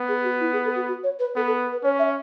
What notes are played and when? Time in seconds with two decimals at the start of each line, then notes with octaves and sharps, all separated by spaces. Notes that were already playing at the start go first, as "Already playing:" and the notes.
Already playing: B3
0.09 G#4
0.24 F#4
0.41 E4
0.53 G#4
0.65 A4
0.76 F#4
0.88 F#4
1.04 C#5
1.19 B4
1.36 B3 A4
1.47 A4
1.72 B4
1.84 C#4 C#5
1.99 E5